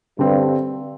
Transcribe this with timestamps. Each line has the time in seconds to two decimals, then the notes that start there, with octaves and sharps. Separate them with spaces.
0.19 G2 D3 G3 C4